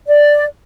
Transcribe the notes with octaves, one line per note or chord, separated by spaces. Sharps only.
D5